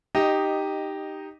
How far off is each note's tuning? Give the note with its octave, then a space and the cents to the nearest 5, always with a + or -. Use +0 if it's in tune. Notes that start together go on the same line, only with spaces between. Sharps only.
D#4 -10 G4 +0 D#5 +0